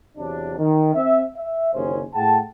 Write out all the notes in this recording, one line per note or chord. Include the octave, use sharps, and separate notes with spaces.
E2 C3 F#3 D4
D#3
C4 E5
E5
F#1 D#2 C3 C#4 G#4 C5
A2 G#4 F#5 G5 A5